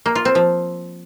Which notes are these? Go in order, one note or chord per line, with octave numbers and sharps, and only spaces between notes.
A#3
F4
C4
F3